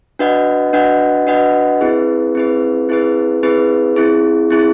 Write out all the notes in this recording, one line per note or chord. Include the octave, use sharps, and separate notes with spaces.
D4 F#4 B4 D#5 F#5
D4 F#4 B4 D#5 F#5
D4 F#4 B4 D#5 F#5
C4 E4 G#4 B4
C4 E4 G#4 B4
C4 E4 G#4 B4
C4 E4 G#4 B4
C4 E4 G#4
C4 E4 G#4